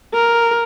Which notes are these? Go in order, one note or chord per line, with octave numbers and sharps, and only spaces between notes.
A#4